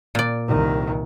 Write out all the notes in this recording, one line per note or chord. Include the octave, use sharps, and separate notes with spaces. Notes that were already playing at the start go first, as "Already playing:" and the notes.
A#2 D5
C2 D#3